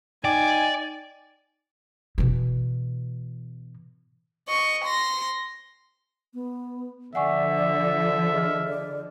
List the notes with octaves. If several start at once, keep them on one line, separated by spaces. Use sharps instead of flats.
D#4 D5 G5 G#5 D6
B2 E3
D#5 C#6
C6 A#6
B3
D3 F3 D5 E5 F#5 G#5 C#6
G#4 D#5 F6
D5